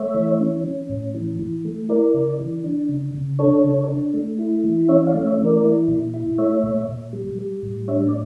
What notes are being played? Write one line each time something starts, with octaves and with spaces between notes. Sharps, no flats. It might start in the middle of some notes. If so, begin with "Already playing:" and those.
Already playing: A3 C#5 E5
E3
C#4
C#4
A2
E3
E3
A3
E4 A#4 D5
C#3
E3
D4
C#3
C#3
D4 A4 C#5
C#3
D4
A3
E4
E3
C#4 C#5 E5
D5 F5
A3
C#5 E5
E3
A#4 D5
E4
A#2
E4
A3 C#5 E5
A#2
A#2
G3
G3
A2
D4 C#5 E5
D5